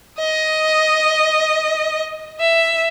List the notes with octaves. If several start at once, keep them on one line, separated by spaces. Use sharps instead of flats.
D#5
E5